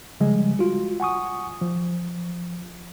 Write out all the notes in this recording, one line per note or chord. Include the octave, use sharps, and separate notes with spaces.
C#3 F3 G3 G#3
F4 F#4
F#5 G#5 C#6 D#6
F3